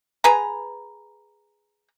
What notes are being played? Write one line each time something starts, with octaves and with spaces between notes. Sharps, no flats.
G#4 B4 A#5